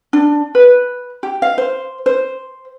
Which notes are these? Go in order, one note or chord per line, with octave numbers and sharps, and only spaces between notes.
D4
B4
G4
F5
C5
C5